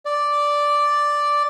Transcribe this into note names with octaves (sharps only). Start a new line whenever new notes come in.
D5